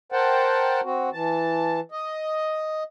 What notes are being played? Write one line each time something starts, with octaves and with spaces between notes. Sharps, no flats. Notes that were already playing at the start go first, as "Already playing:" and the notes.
A#4 C5 F#5 G5 A5
C4 F#4
E3 A5
D#5